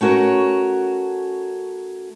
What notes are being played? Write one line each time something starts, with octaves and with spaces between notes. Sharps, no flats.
A3 C#4 F#4 A#4 C#5